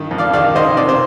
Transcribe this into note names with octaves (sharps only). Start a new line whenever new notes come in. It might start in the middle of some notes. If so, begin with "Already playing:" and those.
Already playing: G2 D#3
F2
D5 F5
D#3 D5 F5
D#3 C5 D#5
C3 D5
C5